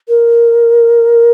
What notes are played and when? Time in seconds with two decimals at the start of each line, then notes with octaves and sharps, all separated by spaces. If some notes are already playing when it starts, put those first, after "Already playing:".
0.08 A#4